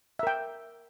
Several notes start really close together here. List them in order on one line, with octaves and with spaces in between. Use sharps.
E5 A#4 G5